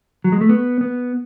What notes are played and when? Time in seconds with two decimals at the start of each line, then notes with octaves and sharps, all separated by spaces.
0.24 F#3
0.32 G#3
0.41 A3
0.49 B3
0.81 B3